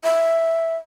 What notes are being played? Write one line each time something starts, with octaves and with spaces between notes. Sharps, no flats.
E5